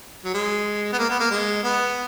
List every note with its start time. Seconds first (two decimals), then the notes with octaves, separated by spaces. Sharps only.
0.25 F#3
0.34 G#3
0.92 B3
0.98 A#3
1.09 B3
1.20 A#3
1.31 G#3
1.63 B3